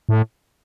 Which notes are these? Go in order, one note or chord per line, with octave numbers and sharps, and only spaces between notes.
A2